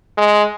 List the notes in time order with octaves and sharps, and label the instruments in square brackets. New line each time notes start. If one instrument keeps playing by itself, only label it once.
[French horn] G#3